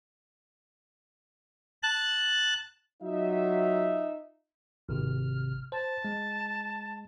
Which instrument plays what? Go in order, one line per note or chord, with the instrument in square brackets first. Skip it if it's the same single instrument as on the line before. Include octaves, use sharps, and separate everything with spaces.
[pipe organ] A5 F#6
[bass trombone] F#3 [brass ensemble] D#4 F4 E5
[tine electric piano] G#1 C3 [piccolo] F6
[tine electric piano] C5 [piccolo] A5
[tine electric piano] G#3